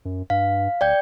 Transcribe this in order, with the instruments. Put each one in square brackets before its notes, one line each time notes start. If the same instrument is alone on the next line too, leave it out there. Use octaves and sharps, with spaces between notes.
[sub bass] F#2
[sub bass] G2 [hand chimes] F5
[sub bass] D1 [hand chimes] D5 G5 G6